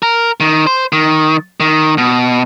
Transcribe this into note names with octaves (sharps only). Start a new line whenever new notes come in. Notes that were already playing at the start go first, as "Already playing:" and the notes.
A#4
D#3
C5
D#3
D#3
B2